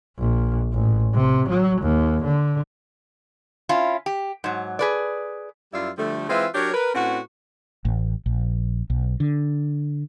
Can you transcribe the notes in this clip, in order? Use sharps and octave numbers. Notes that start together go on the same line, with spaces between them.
A#1
A1
C3
F#3
D#2
D3
C#4 E4 F4
G4
G#2 F#3
G#4 B4 D5
F#2 G3 E4 F4 D5 E5
D3 F3 G3 A3
E3 G#3 C4 F4 B4 E5
F#3 D4 G4 A#4 C#5
A#4 B4
A2 C4 C#4 F#4 B4 F#5
A1
A#1
B1
D3